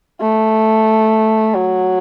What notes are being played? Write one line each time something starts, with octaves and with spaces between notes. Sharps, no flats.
A3
F#3